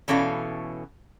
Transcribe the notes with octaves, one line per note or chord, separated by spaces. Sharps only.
B2 E3 C#4 A4 F5